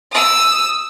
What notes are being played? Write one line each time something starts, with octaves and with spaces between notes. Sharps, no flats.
D#6 E6